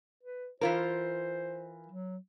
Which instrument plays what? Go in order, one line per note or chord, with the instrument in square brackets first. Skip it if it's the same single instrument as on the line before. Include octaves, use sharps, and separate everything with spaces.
[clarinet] B4
[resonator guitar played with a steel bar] E3 F4 A#4 [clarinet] C5
[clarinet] F#3